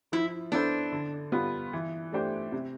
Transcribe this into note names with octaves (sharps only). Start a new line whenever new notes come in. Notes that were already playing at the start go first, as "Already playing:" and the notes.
F3 E4
B3 D4 E4 A4 C5
D3
G3 B3 F4
E3
A3 D4 G4 C5
C3